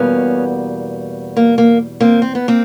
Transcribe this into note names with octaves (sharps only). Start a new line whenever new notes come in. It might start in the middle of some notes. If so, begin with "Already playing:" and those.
Already playing: E2 B2 G3 A#3 B3 C#4
A#3
A#3
A#3 C4
C4
B3
A#3 C4